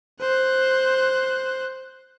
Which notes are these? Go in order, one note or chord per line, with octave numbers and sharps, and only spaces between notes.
C5 F#6